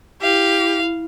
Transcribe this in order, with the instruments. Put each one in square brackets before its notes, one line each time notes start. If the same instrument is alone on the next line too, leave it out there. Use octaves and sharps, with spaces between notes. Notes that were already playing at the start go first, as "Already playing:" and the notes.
[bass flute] E4 [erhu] G4 [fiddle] F5